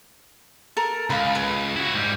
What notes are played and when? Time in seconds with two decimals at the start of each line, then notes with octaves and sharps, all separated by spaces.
0.77 A4 A#4
1.10 C#2 F5 B5
1.35 G#4 B4
1.76 E4 F#4
1.94 G#2 G3